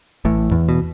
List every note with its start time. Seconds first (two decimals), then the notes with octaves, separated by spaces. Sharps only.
0.25 A1 A2
0.51 E2
0.69 B2